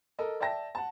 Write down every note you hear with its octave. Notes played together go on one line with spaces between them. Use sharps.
A4 A#4 D#5
D5 E5 G5 A5 A#6
F#5 A5